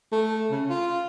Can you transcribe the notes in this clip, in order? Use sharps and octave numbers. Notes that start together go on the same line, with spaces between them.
A3
C#3
F4